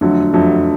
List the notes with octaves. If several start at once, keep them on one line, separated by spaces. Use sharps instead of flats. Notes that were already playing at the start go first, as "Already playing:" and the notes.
F2 D3 F#3 A3
F2 D3 F#3 A3